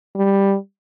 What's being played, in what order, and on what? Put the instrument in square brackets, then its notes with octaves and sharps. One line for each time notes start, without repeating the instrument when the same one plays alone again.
[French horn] G3